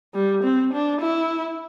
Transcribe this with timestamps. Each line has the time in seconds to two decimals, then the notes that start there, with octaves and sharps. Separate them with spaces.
0.14 G3
0.44 C4
0.73 D4
1.01 E4